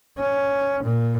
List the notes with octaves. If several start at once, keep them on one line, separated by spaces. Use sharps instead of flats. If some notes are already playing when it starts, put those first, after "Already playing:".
C#4
A#2